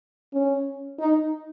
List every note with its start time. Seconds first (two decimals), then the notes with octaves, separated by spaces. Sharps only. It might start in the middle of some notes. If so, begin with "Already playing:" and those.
0.33 C#4
0.99 D#4